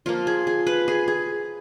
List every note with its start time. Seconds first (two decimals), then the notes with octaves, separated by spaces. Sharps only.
0.06 F3 A#3 F4
0.27 G#4
0.47 G#4
0.67 B4
0.88 G#4
1.08 G#4